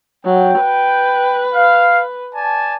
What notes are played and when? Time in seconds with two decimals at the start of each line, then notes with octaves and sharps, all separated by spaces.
0.25 F#3 G5
0.61 B4
1.53 F5
2.35 D5 G#5 A5